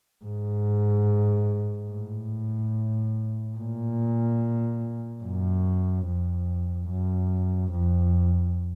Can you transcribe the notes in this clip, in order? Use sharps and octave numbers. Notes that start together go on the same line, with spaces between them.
G#2
A2
A#2
F#2
F2
F#2
F2